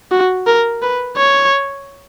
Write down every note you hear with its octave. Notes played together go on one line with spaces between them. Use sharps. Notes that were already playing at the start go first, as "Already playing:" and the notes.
F#4
A#4
B4
C#5